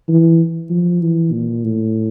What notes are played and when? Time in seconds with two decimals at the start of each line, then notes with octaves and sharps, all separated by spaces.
0.08 E3
0.70 F3
1.01 E3
1.32 A#2
1.64 A2